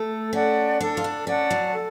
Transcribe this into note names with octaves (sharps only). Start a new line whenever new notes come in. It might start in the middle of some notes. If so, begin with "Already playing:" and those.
Already playing: A3 A4
C#4 D5 F#5 A5
D4 A4
F4
D4
C#4 D5 F#5 A5
F#3
A4